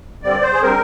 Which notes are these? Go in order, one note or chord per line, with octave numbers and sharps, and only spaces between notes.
G2 D3 G3 C4 D5
C5
G#4
D3 G3 C4 A#4